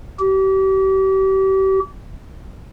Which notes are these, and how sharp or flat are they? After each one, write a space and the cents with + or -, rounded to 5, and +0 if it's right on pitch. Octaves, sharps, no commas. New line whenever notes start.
G4 -35